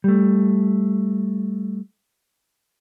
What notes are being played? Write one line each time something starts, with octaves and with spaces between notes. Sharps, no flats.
G3 A3